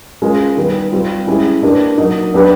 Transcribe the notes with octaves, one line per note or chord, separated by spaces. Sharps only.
G#3 C#4 F4 A#4
D#3 G3 B3
G3 C4 F4
G#3 C#4 E4 G4
A#3 D4 G4 B4
F#3 A#3 D#4
F#3 B3 D4 G4 B4